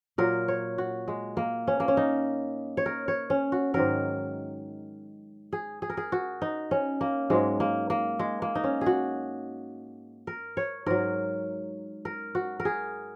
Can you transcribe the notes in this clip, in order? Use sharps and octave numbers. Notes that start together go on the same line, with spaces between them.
A#2 F#3 A#4
C#5
F#4
G#3
A#3
C#4
A#3
C#4
D#4
C#5
A#4
C#5
C#4
F#4
G#2 D#3 F#3 A#4
G#4
G#4
A#4
G#4
F#4
D#4
C#4
A#3
G#2 F#3 G#3
A#3
A#3
G#3
A#3
D#4
C#4
G#4
F#4
A#4
C#5
G#2 F#3 A#4
A#4
F#4
A#4
G#4